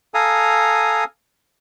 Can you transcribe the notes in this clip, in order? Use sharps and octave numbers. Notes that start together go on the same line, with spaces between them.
A4 F5 G#5 A#5 D#6